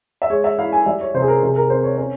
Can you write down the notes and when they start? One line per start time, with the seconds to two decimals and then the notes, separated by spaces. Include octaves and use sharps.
0.22 E5
0.30 G#3 C#5
0.44 E5
0.59 E4 F5
0.72 G#5
0.86 G3 E5
1.01 C#5
1.14 C3 C5
1.22 G#4
1.28 A#4
1.42 C3 G#4
1.56 A#4
1.70 C4 C5
1.84 C#5
1.96 C#4 C5